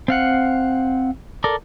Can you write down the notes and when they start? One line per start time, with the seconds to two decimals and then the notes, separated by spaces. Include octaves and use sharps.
0.08 C4 F5 F#5
1.44 A4 A#4 D5